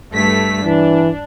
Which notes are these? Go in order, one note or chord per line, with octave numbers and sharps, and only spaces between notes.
G2 A3 B6
E3 D4